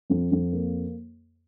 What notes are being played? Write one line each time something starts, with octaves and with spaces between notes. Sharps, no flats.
F2
F2
A#3